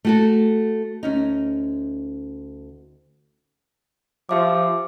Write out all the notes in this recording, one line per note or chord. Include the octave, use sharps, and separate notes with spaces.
A3 F#4 A4
D2 C#4 D#4
F3 G4 E5 D6